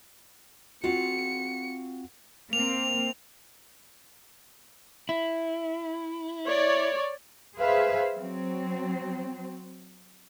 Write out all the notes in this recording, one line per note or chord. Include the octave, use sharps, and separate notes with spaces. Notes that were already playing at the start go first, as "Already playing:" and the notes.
C4 F4 F#4 F#5 C#7
A#3 C4 F7
E4
C#5 D5
G#4 B4 C5 E5 F5
F#3 C4